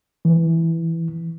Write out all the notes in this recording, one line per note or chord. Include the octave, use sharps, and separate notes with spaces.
E3